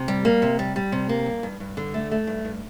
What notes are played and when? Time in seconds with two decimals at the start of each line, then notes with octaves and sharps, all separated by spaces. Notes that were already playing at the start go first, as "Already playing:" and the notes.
Already playing: C3
0.08 G3
0.25 A#3
0.42 C3
0.59 G3
0.76 G3
0.92 C3
1.09 A#3
1.26 G2
1.43 G2
1.60 G2
1.77 D3
1.94 A3
2.11 A3
2.27 G2
2.45 G2